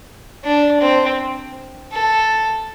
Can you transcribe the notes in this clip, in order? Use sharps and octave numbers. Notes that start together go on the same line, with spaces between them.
D4
C4
A4